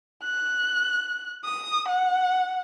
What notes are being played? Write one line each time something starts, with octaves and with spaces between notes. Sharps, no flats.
F#6
D#6
F#5